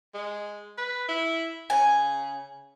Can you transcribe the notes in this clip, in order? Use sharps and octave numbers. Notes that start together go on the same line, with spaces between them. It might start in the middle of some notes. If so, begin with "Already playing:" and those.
G#3
B4
E4
C#3 G#5